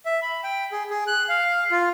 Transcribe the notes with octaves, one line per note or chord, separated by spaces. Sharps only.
E5
B5
G5
G#4
G#4
F#6
F5
F4